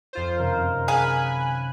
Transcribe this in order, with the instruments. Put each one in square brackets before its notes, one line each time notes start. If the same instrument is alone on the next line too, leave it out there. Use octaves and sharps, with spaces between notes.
[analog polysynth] F2 F4 C5
[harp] F#2 C3 D#3 [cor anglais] A#4
[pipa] G#4 F5 [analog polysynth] G#5 B5 F#6